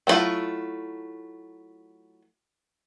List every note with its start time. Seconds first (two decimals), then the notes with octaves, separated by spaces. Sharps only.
0.07 F#3 A3 B3 E4 F4